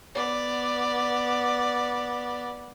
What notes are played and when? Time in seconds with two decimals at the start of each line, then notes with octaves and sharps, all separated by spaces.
0.15 B3 D5